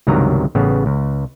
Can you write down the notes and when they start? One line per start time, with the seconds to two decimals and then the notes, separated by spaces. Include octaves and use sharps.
0.07 C#2 G2 C3 D#3 F#3 A#5
0.55 A1 C#3 B3
0.86 C#2